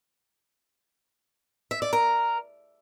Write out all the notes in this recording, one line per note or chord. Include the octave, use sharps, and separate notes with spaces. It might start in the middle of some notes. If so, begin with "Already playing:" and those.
E5
D5
A#4